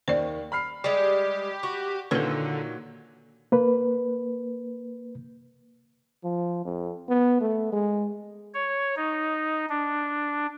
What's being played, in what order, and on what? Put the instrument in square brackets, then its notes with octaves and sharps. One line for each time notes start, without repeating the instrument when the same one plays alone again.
[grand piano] D#2 D#3 [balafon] C5 D5
[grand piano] B5 F6 C7
[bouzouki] G3 G#3 [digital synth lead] G4 [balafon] D5
[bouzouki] F#4
[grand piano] A#2 D#3 [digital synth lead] D3 [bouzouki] F#3 [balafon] A4 B4
[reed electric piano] A#3 B4
[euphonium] F3
F2
B3
A3
G#3
[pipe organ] C#5
D#4
D4